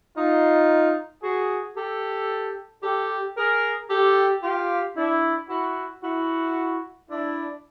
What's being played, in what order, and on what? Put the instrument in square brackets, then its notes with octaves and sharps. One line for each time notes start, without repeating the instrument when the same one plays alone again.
[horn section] D#4 F4
F#4 G#4
G4 A4
G4 A4
G#4 A#4
G4 A4
F4 G4
D4 E4
E4 F#4
E4 F#4
D4 E4